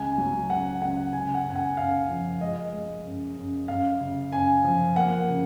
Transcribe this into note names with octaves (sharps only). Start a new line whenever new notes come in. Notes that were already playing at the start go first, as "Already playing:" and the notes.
Already playing: C#2 G#5
F#3
C#2 F#5
C#2 F#5
C#3 G#5
F#5
F#2
G#5
F#5
F#2 F5
F3
G#3 D#5
G#3
F#2
F#2
F#2 F5
C#3
F#2 G#5
F3
A#3 F#5
C#3